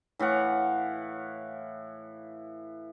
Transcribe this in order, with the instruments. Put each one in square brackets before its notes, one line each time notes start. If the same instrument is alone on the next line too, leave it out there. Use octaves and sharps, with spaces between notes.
[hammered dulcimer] A2 E3 F5 F#5